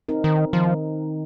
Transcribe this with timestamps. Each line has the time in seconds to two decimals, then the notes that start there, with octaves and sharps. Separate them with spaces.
0.09 C4 D#4 A#4
0.24 D#3
0.53 D#3 F3